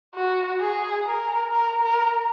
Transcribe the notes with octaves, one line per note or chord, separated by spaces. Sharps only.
F#4
G#4
A#4
A#4
A#4